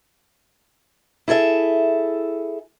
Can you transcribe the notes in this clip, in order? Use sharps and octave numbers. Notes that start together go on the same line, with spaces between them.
E4 G#4 A4 E5